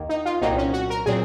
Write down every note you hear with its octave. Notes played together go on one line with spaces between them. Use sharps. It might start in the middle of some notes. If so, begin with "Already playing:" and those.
Already playing: D#2 D#3 A#3
D#4
F4
C2 A#2 F#3 C4 D#4
C#4
F#4
A#4
A#2 F#3 C4 G#4